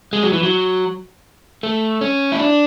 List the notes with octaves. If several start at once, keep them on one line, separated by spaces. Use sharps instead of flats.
G#3
F#3
E3
F#3
A3
C#4
E4
D4